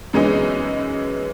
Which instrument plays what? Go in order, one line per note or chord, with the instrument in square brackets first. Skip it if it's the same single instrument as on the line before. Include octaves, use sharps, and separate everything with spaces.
[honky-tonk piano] F#2 E3 G#3 B3 C#4 D#4